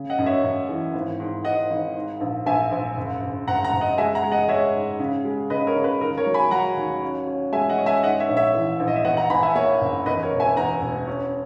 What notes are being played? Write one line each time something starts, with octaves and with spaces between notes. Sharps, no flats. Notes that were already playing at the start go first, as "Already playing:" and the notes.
Already playing: C#3
D#5 F#5
F#2
C#5 E5
F#2
E3
G#1
G#2
G#2 D#5 F#5
G#1
G#2
A#1
A#1 E5 G#5
A#1
F#1
F#1
F#1 F#5 A#5
F#5 A#5
F#1
D#5 F#5
G#3 E5 G#5
F#5 A#5
G#3
D#5 F#5
G#3 C#5 E5
G#2
C#3
G#3
C#3 B4 D#5
A#4 C#5
C#3
B4
D#2 A#4
A#4 C#5
F#3
G#5 B5
F#3 F#5 A#5
D#2
C#4
C#4
G#3 E5 G#5
D#5 F#5
C#4
E5 G#5
G#2 D#5 F#5
C#5 E5
A#1
C#5 E5
E3
A#1
D#5
E5
E2 D#5 F#5
F#5 A#5
E2 G#5 B5
E5 G#5
A#3 C#5 E5
F#1
E2 B4 D#5
A#4 C#5
E1
E5 G#5
E2 F#5 A#5
E1
C#4